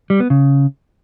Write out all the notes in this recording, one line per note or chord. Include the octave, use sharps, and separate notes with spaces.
G3
B3
C#3